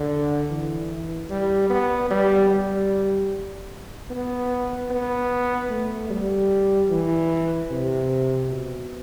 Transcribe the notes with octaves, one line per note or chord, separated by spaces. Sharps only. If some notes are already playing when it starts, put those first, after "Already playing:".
Already playing: D3
E3
G3
B3
G3
G3
B3
B3
A3
G3
E3
C3
B2